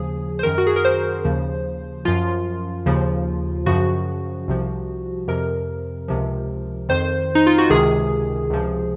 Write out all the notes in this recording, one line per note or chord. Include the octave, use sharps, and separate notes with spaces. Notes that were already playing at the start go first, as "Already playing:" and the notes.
Already playing: D#2 C#3 F3 G#4
C5
F#2 D#3 A#4
F#4
G#4
A#4
C5
D#2 C#3 F3
F#2 F3 F4
D#2 C#3 F3
F#2 C#3 F3 F#4
C2 C3 F3
F2 C3 F3 A#4
C#2 C3 F3
F2 D#3 C5
D#4
F4
F#4
C#2 C3 D#3 G#4
C#2 C3 F3